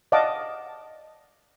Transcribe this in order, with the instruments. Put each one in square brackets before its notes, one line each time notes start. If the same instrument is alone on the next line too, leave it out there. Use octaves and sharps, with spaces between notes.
[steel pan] D5 D#5 F5 F#5 A5 D6